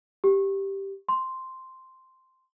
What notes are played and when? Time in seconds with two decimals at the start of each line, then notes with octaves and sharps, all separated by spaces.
0.24 G4
1.09 C6